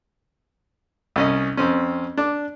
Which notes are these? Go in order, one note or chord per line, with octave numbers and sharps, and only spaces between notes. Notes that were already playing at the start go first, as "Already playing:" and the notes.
C2 C#4 D#5
F2 C4 C#4
D4 D6